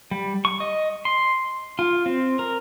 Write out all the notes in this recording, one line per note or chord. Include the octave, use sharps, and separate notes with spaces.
G3
C#6
D#5
C6
F4
C4
A#4